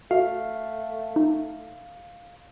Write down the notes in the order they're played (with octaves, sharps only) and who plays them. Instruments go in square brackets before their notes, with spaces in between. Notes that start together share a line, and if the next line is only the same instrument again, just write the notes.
[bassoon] A3 [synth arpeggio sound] F#4 E5 [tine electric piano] F5
[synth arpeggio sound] D#4